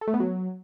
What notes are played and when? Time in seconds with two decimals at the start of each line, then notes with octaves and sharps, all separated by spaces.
0.01 A4
0.08 A3
0.14 B3
0.20 F#3